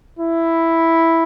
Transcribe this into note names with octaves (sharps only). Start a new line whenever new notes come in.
E4